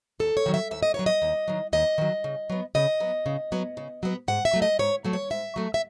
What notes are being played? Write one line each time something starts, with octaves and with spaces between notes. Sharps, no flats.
D#2 A4
C#5
D#3 F#3
E5
D#2 E5
D#5
D#3 F#3 C#5
D#5
D#2
D#3 F#3
D#2 D#5
D#3 F#3
C#3
F#3 B3
C#3 D#5
F#3 B3
C#3
F#3 B3
C#3
F#3 B3
G#2 F#5
E5
F#3 A3
D#5
G#2 C#5
F#3 A3
C#5
G#2 E5
F#3 A3
E5